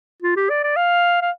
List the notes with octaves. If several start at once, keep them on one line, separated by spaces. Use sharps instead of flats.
F4
G4
D5
D5
F5
F5